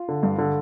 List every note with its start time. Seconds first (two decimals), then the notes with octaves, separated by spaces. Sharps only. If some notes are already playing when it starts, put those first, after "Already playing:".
Already playing: F4
0.09 D3
0.23 G2
0.38 D3